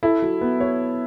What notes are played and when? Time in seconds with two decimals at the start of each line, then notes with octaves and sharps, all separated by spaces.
0.03 E4 A4
0.22 F#3
0.41 B3
0.61 C#5